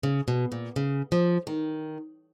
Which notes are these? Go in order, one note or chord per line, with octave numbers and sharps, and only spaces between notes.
C#3
B2
A#2
C#3
F3
D#3